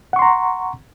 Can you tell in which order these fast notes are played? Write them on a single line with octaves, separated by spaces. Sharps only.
F#5 C#6 C6 A#5